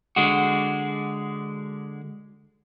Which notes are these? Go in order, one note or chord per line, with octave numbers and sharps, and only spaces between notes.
D3 G#3 F#4